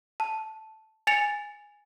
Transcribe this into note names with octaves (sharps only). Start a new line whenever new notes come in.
A5
G#5 A6 C#7 F7